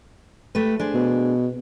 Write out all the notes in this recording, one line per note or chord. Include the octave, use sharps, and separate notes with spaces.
A3 G4 B4
D4 G#4 C5
B2